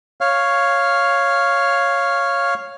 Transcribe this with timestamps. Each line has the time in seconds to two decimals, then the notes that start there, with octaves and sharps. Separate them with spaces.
0.21 C#5 F5